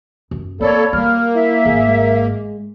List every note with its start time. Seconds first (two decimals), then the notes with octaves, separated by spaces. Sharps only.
0.31 F#2
0.61 A#3 C4 A4 C#5 D5 B5
0.93 G3 A#3 F6
1.34 E4 E5
1.65 G#1 G#2 G#4
1.87 G#3